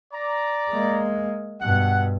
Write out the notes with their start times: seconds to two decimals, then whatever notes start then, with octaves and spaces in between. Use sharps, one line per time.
0.13 D5 A#5
0.70 G#3 A#3
1.62 G2 B2 F#5